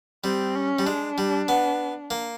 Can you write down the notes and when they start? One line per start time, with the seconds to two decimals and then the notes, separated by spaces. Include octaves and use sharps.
0.24 G3 C4
0.55 C#4
0.79 G3
0.86 G#3 D4
1.18 G3
1.48 B3
2.11 A#3